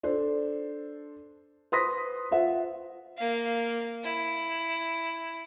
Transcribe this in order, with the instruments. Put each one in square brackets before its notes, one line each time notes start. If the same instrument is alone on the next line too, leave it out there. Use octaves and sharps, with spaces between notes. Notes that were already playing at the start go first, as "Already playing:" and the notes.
[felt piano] D4 A4 C5
B4 C5 C6 D#6 A#6 B6
F4 C5 E5 F#5
[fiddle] A#3 F5
E4